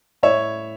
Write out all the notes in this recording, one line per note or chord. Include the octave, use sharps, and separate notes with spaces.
A2 C#5 E5